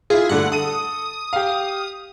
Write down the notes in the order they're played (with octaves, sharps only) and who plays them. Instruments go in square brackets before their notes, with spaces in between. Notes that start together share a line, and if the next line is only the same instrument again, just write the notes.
[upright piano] E4 F4 [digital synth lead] G#4
[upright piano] G2 D3 A3 [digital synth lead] F#5
[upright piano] A4 D#7 [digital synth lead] D#6
[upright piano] G4 F5